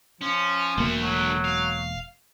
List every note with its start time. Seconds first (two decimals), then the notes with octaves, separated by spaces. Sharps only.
0.21 F3 C#4
0.78 E1 A3 A#3 F#4
1.02 F#3
1.45 F5